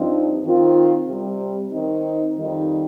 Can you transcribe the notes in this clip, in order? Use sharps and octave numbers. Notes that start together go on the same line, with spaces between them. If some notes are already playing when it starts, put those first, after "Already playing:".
Already playing: G2 F3 C4 D#4
D#3 C4 F4
C3 G3 C4
D#3 C4 D#4
F2 D#3 G3 D#4